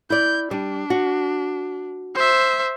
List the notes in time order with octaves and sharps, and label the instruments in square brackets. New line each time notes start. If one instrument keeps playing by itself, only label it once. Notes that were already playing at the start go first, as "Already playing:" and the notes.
[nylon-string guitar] E4 D5 [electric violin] G6
[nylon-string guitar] G3 [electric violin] D4
[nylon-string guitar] F#4
[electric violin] C5 E5